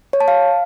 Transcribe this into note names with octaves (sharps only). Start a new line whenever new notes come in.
C#5
A5
F5